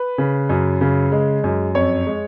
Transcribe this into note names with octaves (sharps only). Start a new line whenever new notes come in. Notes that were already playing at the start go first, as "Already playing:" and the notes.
Already playing: B4
C#3
F#2
C#3
G#3
F#2
F2 C#5
G#3